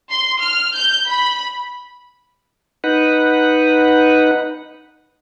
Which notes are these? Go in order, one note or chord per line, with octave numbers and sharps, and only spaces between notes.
C6
F6
G6
B5
D#4 B4 F#5